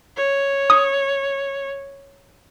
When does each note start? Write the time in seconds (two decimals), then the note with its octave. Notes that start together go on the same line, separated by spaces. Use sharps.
0.16 C#5
0.70 D#6